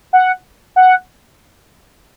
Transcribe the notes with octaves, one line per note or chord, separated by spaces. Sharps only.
F#5
F#5